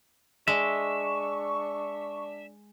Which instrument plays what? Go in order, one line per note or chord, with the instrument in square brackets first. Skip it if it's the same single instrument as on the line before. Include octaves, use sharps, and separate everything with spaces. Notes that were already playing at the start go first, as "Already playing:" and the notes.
[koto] G#3 [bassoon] D4 [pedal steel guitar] E5 [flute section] C#6